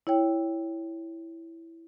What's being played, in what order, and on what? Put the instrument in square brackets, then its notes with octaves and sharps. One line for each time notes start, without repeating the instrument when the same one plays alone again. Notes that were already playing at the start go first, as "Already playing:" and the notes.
[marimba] E4 C#5 G5